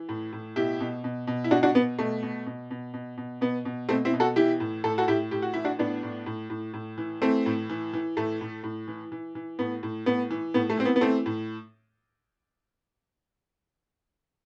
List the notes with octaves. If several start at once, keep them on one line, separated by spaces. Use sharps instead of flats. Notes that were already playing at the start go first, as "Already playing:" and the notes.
Already playing: E3
A2
A2
B2 E4 G4
B2
B2
B2
E4
B2 D4 F#4
D4 F#4
B2 B3
B2 A3
B2
B2
B2
B2
B2
B2 B3
B2
B2 A3 C4
C4 E4
B2
F#4 A4
E3 E4 G4
A2
A2 A4
F#4 A4
A2 E4 G4
A2 G4
F#4
E3 E4
D4 F#4
A2 B3 D4
A2
A2
A2
A2
E3
E3 A3 C4
A2
E3
E3
A2 A3
A2
A2
E3
E3
E3
A2 B3
A2
A2 B3
E3
A2 B3
A3
E3 C4
B3
B3
E3 A3 C4
A2